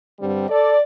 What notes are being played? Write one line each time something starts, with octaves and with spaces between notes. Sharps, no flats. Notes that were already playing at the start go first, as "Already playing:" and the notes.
G2 D3 G3 C4
A4 D5